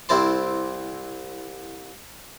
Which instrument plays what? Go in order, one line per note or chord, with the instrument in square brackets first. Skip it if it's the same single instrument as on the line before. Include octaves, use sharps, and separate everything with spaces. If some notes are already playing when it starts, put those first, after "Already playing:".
[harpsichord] C2 C4 E4 C5 A5 C6